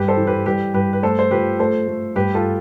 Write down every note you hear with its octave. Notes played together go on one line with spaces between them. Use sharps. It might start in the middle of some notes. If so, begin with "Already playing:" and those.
Already playing: G2 G3 G4 B4
A4 C5
E3
G4 B4
G3 G4 B4
G2 G4 B4
B4
A3 A4 C5
C5
F3 G4 B4
A3 A4 C5
A3
G2 G4 B4
F4 A4